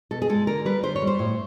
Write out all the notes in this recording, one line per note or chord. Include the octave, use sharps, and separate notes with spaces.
B2 A4
G#4
G#3 A4
D3 A#4
G3 B4
D3 C5
C#5
G3
C5
A2